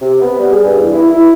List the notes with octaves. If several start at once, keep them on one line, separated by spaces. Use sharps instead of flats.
C3
B3
G3
G#4
G2
E2
E4
E4